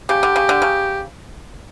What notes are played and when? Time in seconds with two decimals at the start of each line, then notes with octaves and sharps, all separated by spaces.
0.09 C#3 G4
0.23 D3
0.36 C#3
0.49 D3
0.62 C#3